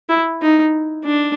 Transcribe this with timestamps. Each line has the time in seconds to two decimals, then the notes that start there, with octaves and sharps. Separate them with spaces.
0.09 E4
0.42 D#4
1.05 D4